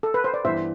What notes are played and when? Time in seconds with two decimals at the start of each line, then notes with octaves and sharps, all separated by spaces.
0.03 A4
0.14 B4
0.24 C5
0.34 D5
0.44 G2 E3 B3 C5 E5